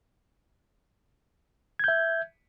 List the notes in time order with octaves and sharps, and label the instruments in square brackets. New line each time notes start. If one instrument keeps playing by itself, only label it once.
[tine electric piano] G#6
G6
E5